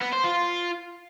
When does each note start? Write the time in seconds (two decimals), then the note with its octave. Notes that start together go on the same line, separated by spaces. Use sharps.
0.02 B3
0.13 C5
0.24 F4